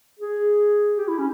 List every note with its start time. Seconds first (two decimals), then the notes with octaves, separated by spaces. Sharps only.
0.19 G#4
0.98 G4
1.08 E4
1.19 C#4